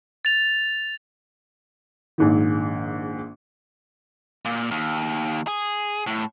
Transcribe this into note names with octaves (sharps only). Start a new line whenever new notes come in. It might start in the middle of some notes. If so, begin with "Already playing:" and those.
A6 F7
A#1 G#2 D#3
A#2
D#2
G#4
A2